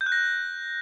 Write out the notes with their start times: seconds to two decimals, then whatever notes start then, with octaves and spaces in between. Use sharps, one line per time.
0.01 G6
0.06 F#6
0.12 A#6